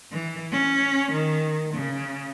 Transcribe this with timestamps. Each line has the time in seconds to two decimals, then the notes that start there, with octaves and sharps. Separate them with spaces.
0.12 E3
0.52 C#4
1.11 D#3
1.74 C#3